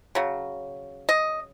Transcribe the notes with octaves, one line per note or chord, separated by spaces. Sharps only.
C#3 F#3
D#5